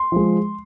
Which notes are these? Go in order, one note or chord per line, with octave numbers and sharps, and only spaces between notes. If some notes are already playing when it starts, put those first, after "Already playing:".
Already playing: C6
F3 G#3